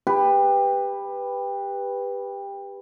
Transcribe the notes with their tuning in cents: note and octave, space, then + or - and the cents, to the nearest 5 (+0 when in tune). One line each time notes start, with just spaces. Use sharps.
G4 +20 B4 +0